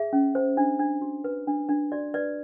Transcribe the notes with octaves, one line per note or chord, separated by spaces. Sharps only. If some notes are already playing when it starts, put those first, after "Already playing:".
Already playing: G#4 E5
C#4
C5
D4
D4
F#4
B4
D4
D4
F#4 D5
B4 D5